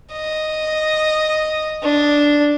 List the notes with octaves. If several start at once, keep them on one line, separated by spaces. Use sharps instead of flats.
D#5
D4